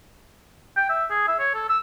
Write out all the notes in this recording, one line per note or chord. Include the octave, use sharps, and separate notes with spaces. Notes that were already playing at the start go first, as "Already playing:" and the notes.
G5
E5
G#4
E5
C#5
A4
E6